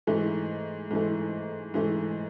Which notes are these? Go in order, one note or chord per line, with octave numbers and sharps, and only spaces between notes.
G#2 E3 A3
G#2 E3 A3
G#2 E3 A3